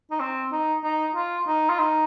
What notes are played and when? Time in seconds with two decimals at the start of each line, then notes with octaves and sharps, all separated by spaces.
0.11 D#4
0.20 C4
0.52 D#4
0.84 D#4
1.15 F4
1.47 D#4
1.69 F4
1.79 D#4